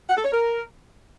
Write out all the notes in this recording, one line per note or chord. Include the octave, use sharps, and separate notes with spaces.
F#5
A4
C#5
A#4